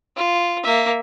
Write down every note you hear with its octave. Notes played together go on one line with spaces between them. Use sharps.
F4
A#3 E5